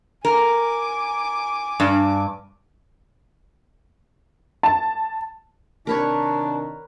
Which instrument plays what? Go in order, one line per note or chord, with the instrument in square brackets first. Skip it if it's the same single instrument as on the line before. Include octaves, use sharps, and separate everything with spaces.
[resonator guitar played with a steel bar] A#4 [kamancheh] G#5 D6
[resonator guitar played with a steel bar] G2
[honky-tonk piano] A5
[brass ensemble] C3 D#3 D4 [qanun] A#4 B4 C#5 [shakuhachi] A5